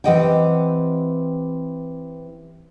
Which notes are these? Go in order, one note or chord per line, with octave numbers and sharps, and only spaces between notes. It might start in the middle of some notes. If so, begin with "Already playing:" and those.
E3 C4 G4 D#5 F#5 G5